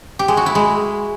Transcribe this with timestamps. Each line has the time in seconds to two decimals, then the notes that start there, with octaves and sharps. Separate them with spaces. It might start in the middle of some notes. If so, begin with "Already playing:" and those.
0.19 G4
0.28 G#3
0.37 F#4
0.46 E4
0.55 G#3